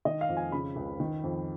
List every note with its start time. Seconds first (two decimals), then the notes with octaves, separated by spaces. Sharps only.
0.05 D#3 D#5
0.21 F5
0.29 F2
0.37 G#5
0.52 C#3 B5
0.76 C#2
1.00 D#3
1.23 F2